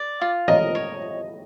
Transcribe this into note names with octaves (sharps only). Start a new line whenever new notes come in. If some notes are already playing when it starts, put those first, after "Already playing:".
Already playing: D5
F4
A#4 D#5
C#5